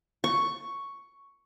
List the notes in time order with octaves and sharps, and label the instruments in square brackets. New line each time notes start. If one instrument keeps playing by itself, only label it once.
[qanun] C#6